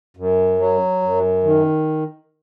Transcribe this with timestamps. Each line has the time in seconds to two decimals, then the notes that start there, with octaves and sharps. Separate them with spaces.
0.17 F#2
0.59 F#3
1.02 F#2
1.44 D#3